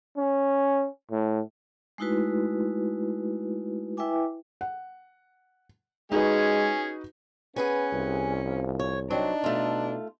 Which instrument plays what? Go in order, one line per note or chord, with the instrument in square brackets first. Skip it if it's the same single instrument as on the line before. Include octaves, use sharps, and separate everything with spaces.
[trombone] C#4
A2
[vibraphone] G#3 A3 D#4 E4 F#4 B4
E4 B4 E5 G5 G#5 D6
[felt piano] F#5
[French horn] G#3 [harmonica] C#4 G#4 [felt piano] D#4 F#4 B4
[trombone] B3 [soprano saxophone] C#4 [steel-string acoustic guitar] G#4 B4 G#5
[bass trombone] C2 [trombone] G2
[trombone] F3
[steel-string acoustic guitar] C#5
[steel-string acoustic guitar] F#3 C4 [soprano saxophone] D4 [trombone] D#4
[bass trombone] B2 [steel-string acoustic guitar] A3 F4